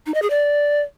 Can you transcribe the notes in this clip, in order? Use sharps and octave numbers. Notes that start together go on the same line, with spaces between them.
D#4
D#5
G#4
D5